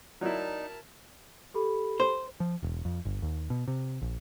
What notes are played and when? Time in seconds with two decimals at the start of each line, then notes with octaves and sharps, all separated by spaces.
0.21 F#3 D#4 E4 A#4 D5 A5
1.54 G4 A4 B5
2.00 C5
2.40 F3
2.63 E1
2.85 F2
3.05 G1
3.22 D#2
3.50 B2
3.68 C3
4.02 A#1